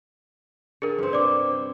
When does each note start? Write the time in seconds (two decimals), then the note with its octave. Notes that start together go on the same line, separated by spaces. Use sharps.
0.82 D3 G#4 A#4
0.98 G2 C4
1.13 C3 D5 G5 D6